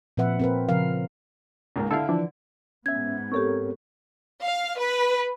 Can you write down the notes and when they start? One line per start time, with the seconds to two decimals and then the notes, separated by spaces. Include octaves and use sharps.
0.17 A#2 F3 C4 B4 E5 F#5
0.39 C4 A#4 B4
0.69 C#3 F3 A#4 F5
1.76 C#2 G#2 A#3
1.91 D3 E4 A4 F5
2.09 E3 F3 D4
2.86 G#2 B3 C#4 E5 G#6
3.32 C4 G4 A4 A#4 C#5 C#6
4.44 F5
4.80 B4